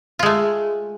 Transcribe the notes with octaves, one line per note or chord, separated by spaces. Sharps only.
G#3 A3 F4